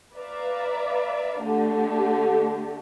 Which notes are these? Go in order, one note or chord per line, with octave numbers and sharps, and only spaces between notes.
B4 D5 E5 F5 A#5
D3 A3 D4 G4